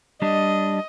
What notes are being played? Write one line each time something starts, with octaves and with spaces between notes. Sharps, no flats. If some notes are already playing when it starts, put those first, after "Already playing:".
G3 D4 D#5